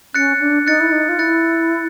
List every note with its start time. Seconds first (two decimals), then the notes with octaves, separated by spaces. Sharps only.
0.14 C#4 F#6 A6 C#7
0.40 D4
0.67 D#4 F#6 A6 C#7
0.80 E4
0.92 D#4
1.09 F4
1.19 E4 F#6 A6 C#7